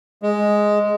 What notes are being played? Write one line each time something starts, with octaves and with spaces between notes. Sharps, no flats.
G#3